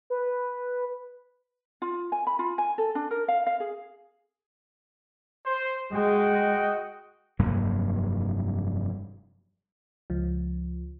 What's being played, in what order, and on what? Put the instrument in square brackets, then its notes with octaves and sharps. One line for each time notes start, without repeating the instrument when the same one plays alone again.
[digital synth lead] B4
[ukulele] F4
G#5
B5
F4
G#5
A4
D4
A#4
F5
F5
G#4
[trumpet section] C5
[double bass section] G#3 [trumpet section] F#4 D#5 G5
[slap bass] F1 G2 F#3 A#3
[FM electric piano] C#2 F3